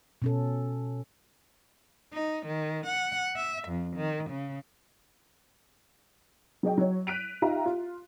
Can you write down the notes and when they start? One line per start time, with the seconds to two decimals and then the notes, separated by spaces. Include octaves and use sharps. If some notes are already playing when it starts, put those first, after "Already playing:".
0.22 B2 C#4 A4
2.13 D#4
2.47 D#3
2.86 F#5
3.37 E5
3.68 F2
3.96 D#3
4.30 C#3
6.63 F#3 G#4 D#5 G5
6.78 F#3 C#5
7.07 F#6 B6 D7 D#7 F7
7.42 D#4 F4 G4 E5 F5 A#5
7.66 F4